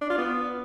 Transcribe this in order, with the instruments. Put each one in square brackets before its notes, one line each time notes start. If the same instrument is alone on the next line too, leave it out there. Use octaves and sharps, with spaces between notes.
[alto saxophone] D4
F4
B3